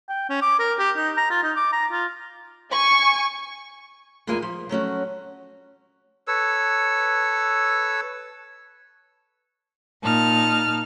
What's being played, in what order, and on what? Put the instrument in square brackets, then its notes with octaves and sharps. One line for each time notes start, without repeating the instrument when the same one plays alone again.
[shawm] G5
C#4
D6
A#4
G4
D#4
A#5
F4
D#4
D6
A#5
F4
[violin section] G#5 C#6
[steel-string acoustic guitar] E2 G#3 A#3 F4 G#4 G#5
F3
F#3 A3 C#4 F#4
[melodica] A4 B4 C#5 E6
[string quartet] A#2 D#4 A5 F6